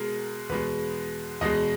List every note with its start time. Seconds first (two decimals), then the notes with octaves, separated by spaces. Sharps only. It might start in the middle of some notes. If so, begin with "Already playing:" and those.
Already playing: B2 G#3 A#4
0.49 E2 B2 G#3 B4
1.41 E2 B2 G#3 D#5